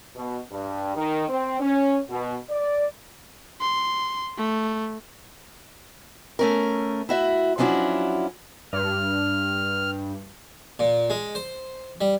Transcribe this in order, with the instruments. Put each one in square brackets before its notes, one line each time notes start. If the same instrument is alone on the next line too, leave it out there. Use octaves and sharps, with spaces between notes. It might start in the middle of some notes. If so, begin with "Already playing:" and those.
[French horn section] B2
G2
D#3
C4
C#4
B2
D5
[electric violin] C6
A3
[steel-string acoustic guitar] A3 C#4 A#4
E4 F#4 E5
F3 F#3 C#4 D4 E4 F#4
[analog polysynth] G2 [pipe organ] F6
[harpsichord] A#2
G#3
C5
G3